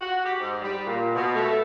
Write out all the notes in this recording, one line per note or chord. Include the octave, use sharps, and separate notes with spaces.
F#4
G4
G#2
G3
A#2
B2
A3